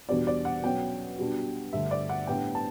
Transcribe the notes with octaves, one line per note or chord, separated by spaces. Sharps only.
E2 B2 G3 D4 D5
D5
F#5
B2 F#3 C#4 G5
B2 G3 D4
G2 D3 A3 E5
D5
F#5
A2 G3 B3 D4 G5
A5